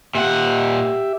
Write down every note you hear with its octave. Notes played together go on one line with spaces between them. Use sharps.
A#2 G4 E5 F#5